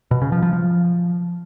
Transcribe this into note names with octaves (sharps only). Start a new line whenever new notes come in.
B2
C#3
F3
F3
F3